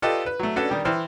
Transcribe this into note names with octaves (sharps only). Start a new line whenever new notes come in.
F4 G4 A4 B4 D5 D#5
B4
F#3 A3
C#4 D4 F#4 A4 B4
D#3 G3 G4
E3 C5 G5 F6